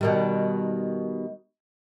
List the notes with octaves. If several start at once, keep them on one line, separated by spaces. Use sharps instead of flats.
B2 D#3 G3